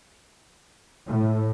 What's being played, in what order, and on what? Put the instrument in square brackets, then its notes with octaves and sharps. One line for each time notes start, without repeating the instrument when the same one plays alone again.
[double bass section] A2